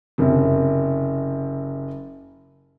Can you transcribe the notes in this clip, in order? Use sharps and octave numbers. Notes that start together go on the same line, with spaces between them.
F#1 C3